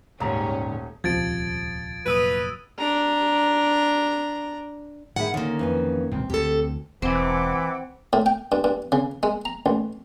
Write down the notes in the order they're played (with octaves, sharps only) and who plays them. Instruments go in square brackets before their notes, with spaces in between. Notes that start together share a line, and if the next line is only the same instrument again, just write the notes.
[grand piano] D#1 [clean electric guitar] C#2 A#5 [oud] G#2 G3 [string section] C#4
[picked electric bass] D#1 C#2 C3 [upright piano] F3 [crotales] G#6 A6 D7
[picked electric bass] F1 A#2 F#3 [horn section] B4 [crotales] D#6 E6 D#7
[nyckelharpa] D4 A#5
[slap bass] A2 [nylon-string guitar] D#3 G#4 E5 [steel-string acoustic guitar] F#5
[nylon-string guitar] D3 [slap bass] D#3 [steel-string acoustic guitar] A#3 C#4
[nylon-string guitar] F2 E3 G#5
[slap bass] E1 C#2 A#2 [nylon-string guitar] C4
[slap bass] D2 [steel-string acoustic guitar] G4 A4
[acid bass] E1 [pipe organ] E3 [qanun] C4 [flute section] F#5 G5 D6
[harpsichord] A2
G5
G2
G2
C#3
G#3
A#5
A1